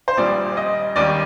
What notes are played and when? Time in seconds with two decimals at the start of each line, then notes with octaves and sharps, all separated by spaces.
0.08 C5
0.17 A#1 A#2 G3 D5
0.57 D#5
0.96 D#2 D#3 G3 D5